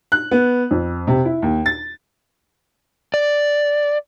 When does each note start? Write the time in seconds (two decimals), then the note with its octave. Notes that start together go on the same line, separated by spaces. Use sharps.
0.12 F#6
0.31 B3
0.71 F2
1.07 C3
1.25 E4
1.42 D#2
1.66 A6
3.14 D5